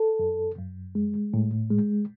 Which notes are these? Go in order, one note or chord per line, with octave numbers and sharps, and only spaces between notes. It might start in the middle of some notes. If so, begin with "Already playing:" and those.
Already playing: A4
F#2
F#2
G#3
A2
G#3